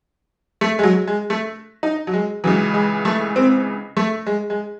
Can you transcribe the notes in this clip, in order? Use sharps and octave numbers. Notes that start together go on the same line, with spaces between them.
A3
G#3
F#3
G#3
A3
D#4
F#3
G#3
C#2 C#3 E3 F#3
G#3
A3
C4
A3
G#3
G#3